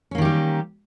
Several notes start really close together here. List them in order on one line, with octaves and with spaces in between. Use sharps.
C#4 A#3 D#3 G4 G3